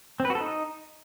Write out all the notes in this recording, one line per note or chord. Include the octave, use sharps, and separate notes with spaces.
C4
B4
F#4
A4
D#4